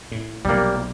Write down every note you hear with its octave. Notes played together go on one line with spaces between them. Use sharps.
A2
B1 C3 G3 A#3